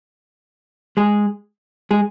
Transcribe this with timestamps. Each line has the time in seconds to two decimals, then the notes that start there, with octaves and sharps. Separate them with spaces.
0.97 G#3 G#4
1.91 G#3 G#4